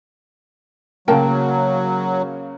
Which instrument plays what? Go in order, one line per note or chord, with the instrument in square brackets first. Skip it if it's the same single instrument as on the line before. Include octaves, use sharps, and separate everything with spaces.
[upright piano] C#3 A#3 [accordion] F#3 [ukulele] A#4 G5 A5